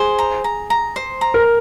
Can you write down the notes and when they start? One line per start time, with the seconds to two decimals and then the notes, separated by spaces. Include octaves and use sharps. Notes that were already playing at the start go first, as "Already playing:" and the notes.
Already playing: G#4 C5
0.19 A#5
0.44 A#5
0.70 A#5
0.96 C5
1.21 A#5
1.34 A#4